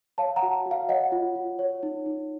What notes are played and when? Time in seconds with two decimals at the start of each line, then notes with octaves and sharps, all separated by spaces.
0.18 C#5 F5 A5
0.36 F#5 A#5
0.42 F#4
0.66 F#4
0.71 F5
0.89 C#5 D#5 F#5
1.12 F4
1.35 F4
1.59 C#5
1.83 D#4
2.06 D#4